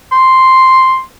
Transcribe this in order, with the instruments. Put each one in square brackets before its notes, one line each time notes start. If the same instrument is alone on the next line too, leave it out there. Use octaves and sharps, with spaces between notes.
[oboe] C6